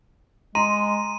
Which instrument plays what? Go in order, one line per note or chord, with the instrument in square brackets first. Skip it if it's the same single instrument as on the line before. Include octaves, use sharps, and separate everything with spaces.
[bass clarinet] G#3 [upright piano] A#5 [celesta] C6 [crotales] D#7